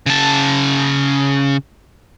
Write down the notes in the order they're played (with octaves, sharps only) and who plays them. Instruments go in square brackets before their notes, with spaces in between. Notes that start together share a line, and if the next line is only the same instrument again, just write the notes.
[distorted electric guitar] C#3 A5